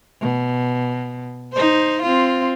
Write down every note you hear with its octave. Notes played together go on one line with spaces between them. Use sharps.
B2
D#4 C5
C4 F4